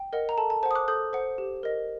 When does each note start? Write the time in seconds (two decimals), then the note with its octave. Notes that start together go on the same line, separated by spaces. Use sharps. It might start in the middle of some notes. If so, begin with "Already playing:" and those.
Already playing: G5
0.13 A#4 D#5 F#5
0.29 A#5
0.38 A4 A5
0.50 A5
0.63 C5 F#5 A5
0.71 D#6
0.75 D6 F#6
0.88 A4 D#6 G6
1.13 C5 F#5
1.38 G4
1.63 A#4 D#5